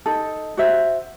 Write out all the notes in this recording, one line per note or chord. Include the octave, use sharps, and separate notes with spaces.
D#4 A4
F#4 C5 E5